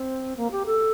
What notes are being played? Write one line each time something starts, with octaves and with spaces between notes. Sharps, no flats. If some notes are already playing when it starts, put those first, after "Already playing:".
Already playing: C4
A#3
G4
A4